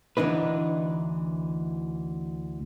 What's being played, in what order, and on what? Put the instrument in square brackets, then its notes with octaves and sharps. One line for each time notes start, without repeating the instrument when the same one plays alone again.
[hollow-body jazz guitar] D2 E3 D4 D#4 B4